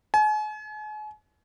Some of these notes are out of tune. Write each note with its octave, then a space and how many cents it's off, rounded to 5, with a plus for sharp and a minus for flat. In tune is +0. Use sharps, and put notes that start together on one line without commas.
G#5 +40